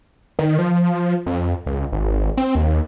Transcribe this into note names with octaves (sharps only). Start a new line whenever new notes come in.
D#3
F3
F2
C#2
G#1
C4
D#2